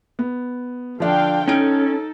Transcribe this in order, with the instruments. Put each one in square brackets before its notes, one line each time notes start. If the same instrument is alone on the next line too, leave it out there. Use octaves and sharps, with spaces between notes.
[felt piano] B3
[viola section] D3 F5 G5 [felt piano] F3 D4
[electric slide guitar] C#4 [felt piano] D#4 F6 D7 [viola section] A4